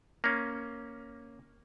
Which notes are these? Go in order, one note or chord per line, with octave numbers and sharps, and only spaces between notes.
A#3 C#4